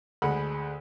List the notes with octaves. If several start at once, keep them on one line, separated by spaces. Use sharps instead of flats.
D2 G#3 F#5 B5